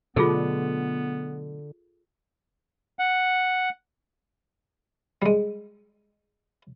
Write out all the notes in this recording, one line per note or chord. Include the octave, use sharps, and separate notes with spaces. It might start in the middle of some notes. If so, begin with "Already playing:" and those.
B2 D3 F#3 A3 B3 F4 G#4 A4
F#5
G3 G#3